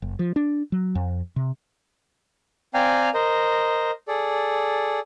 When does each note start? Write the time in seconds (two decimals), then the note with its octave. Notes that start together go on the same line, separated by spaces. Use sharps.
0.02 F#1
0.19 F3
0.36 D4
0.72 F#3
0.95 F2
1.36 C3
2.74 C4 D5 F5 G5 G#5 A#5
3.14 A#4 C5 D#5
4.08 G#4 A4 D5